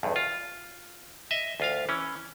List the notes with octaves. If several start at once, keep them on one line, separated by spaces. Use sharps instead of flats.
B1 E2 G2
F4
D#5 E5
D2 F4 F5
E3 C#4